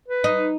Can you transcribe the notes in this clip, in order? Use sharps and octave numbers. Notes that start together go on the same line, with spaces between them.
B4
D#4